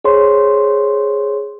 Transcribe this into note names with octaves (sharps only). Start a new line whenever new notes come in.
G#4 C5 C#5 C6